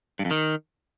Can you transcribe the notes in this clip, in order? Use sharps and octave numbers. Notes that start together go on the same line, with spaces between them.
G2
F2
D#3